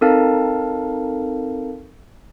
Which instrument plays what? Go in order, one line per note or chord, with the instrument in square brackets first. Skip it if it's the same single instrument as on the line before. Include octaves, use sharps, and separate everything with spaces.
[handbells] C4 D#4 A4 A#4 F5 A5